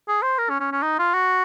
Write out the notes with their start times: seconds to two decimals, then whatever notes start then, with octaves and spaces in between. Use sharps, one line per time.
0.08 G#4
0.22 C5
0.38 A#4
0.49 C#4
0.60 C#4
0.72 C#4
0.83 D#4
0.99 F4
1.14 F#4